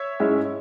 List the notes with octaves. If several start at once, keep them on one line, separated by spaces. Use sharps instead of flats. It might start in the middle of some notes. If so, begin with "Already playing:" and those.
Already playing: C#5 E5
G#2 G#3 C#4 E4